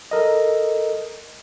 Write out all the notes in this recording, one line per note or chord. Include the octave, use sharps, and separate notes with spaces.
A4 A#4 D#5